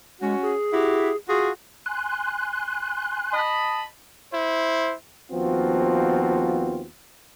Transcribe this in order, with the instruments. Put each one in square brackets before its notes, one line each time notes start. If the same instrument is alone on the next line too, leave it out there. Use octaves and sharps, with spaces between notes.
[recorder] G#3 [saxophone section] C#4 F#4
[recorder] G#4
[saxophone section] E4 F#4 G4
F4 F#4 G#4
[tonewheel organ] G#5 C6 F#6
[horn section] D#5 A5 B5
[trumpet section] E4 C5
[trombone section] D#2 F3 B3 C4 F4 F#4